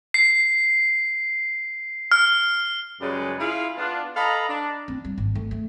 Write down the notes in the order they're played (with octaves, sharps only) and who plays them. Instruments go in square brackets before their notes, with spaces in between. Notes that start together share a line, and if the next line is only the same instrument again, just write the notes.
[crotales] C7
F6
[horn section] F#2 C#3 G3 G#3 B4 D5
E4 F4 G#4 F5
B3 D4 F4
A4 D#5 F5 A#5 B5
D4
[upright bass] C4
G3
G#1
A3
A3